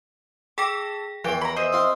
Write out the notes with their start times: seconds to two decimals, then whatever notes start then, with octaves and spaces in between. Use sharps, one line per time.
0.58 G#4 A4 G5 D6 A#6
1.24 E2 E3 F3 G5 D7
1.41 A#5 B5 C#6
1.56 C5 D#5 E5
1.72 C4 F4